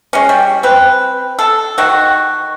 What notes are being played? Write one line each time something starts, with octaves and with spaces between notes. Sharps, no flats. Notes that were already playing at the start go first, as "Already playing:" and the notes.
G#3 C#4
G3
C4 B4
A4
D#3 F#4